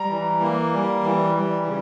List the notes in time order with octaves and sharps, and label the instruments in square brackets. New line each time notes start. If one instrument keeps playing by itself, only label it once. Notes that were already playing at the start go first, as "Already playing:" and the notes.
Already playing: [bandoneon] G3 [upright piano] A#5
[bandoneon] E3
A#3
G3
E3
G3
C#3